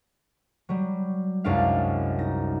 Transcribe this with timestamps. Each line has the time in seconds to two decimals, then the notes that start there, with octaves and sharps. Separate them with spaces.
0.69 F#3 G3
1.44 C2 F#2 G#3 D4 F5
2.19 D#4 A#6